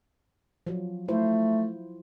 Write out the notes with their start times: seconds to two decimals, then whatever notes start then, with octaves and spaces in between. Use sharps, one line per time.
0.67 F3 F#3
1.08 A3 E4 F4 C5